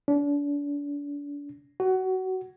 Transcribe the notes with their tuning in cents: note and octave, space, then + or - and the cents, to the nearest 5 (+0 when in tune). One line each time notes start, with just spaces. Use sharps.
D4 -35
F#4 +20